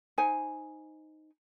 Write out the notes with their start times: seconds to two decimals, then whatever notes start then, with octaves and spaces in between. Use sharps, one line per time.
0.18 D#4 C5 G#5